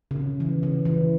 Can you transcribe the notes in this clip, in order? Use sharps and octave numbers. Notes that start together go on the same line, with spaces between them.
C#3
E3
C#3
E3